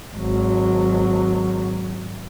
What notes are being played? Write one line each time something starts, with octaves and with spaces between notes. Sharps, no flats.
G#1 F#3